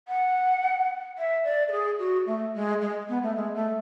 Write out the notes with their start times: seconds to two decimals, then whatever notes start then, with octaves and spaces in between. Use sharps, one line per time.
0.08 F#5
1.18 E5
1.44 D5
1.68 A4
1.72 G#4
1.99 F#4
2.27 A3
2.55 G#3
2.81 G#3
3.09 B3
3.23 A3
3.36 G#3
3.55 A3